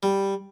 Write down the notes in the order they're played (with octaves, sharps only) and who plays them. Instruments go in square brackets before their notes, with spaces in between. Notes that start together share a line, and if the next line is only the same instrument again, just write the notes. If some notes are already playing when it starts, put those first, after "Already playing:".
[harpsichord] G3